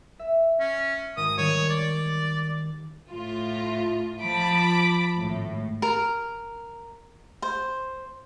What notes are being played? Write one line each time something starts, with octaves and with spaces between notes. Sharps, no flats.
E5
C#4
G#1 D#6
D#3 G3 C#5
D5
A2 F4
F3 A5 B5 D6
G#1 A2
A#4
C5